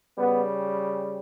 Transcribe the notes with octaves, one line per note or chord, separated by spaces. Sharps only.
C#3 G3 B3